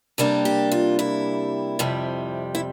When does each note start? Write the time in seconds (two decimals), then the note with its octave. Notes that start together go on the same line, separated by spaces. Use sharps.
0.18 C3 G3 A#3 D4 A4
0.45 G4
0.72 F4
0.99 E4
1.79 F2 C3 G3
2.55 E4